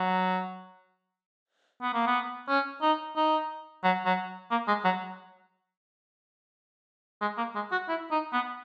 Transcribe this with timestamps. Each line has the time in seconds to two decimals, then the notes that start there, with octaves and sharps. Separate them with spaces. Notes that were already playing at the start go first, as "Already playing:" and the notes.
Already playing: F#3
1.82 B3
1.94 A#3
2.07 B3
2.49 C#4
2.82 D#4
3.16 D#4
3.84 F#3
4.06 F#3
4.51 A#3
4.68 G#3
4.85 F#3
7.21 G#3
7.38 A#3
7.55 G#3
7.72 F#4
7.89 E4
8.11 D#4
8.33 B3